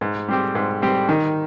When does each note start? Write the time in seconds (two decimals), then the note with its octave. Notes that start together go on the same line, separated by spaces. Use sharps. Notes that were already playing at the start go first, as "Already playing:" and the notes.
0.01 G#2
0.29 G3 C4 G4
0.55 G#2
0.82 G3 C4 G4
1.09 D#3